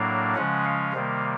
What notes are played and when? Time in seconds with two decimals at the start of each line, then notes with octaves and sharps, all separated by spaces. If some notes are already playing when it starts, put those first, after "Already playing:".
Already playing: A2 F#3 A#3 D4 F5
0.35 C#3 F3 G#3 C#4 F#5
0.64 F5
0.93 C3 D#3 G3 A#3